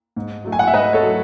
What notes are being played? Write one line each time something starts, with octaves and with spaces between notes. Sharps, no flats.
G#2
F#3 A3
G#5
F#5
E5
G#2 B4 D#5
A4 C#5
F#3 A3